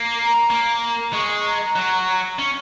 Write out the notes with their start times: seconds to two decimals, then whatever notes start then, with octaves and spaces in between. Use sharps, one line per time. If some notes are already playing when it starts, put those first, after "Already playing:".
Already playing: A#3
0.19 A#5
0.50 A#3
1.13 G#3 C#6
1.44 A#5
1.76 F#3
2.39 C#4